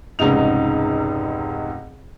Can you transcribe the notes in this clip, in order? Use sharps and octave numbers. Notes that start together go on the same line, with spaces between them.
F1 C#2 G#2 D#4 F7